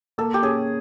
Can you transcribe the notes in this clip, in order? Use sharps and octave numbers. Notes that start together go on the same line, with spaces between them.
A#3 A4
G4
C#4 G#4